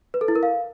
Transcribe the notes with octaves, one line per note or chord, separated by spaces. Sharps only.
B4
A4
E4
A#4
F5